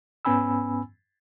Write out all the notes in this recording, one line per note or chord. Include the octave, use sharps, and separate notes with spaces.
G#2 B3 C#4 G#5 B5 E6